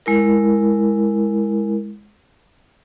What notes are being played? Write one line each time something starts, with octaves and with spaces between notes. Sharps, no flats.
G#3 E4 A#4